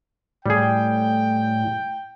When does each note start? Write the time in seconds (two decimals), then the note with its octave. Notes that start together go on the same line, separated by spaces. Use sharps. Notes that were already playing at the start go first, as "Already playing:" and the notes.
0.46 A2 G3 G#4 G5